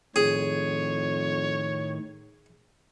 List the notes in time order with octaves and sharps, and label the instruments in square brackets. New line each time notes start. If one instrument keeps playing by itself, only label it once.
[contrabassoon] F2 [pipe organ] A2 D#3 [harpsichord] G#4 [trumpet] C#5